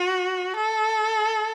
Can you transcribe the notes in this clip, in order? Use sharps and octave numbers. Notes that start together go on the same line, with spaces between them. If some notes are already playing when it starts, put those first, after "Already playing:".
Already playing: F#4
A4